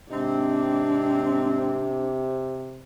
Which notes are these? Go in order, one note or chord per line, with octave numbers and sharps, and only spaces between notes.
G#2 C3 C4 D4 D#4